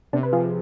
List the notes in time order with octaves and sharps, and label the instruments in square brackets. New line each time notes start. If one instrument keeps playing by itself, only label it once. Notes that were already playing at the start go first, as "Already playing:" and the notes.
[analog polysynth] C3 [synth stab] B3 D4
[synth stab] B4
[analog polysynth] F3 [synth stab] F4 G#4